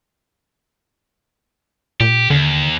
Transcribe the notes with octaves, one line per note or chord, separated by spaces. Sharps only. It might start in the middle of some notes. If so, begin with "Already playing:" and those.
A#2 G4
D#2 D3